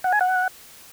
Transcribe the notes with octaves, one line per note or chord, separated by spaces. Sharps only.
F#5
G#5
F#5